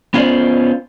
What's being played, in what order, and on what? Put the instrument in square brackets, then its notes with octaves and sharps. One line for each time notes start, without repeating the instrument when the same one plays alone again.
[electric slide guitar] B3 C#4 F4 F#4 C5 D5